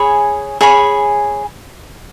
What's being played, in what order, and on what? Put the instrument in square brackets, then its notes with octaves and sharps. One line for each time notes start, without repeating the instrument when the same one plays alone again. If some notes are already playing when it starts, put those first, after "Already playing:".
Already playing: [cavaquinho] G#4 C#5 G#5 B5
G#4 C#5 G#5 B5